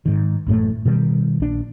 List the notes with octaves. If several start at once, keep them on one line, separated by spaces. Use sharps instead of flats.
G#2 D#3
A1 F#2 A2 A3
B2 D#3 F#3 G3
A#1 D4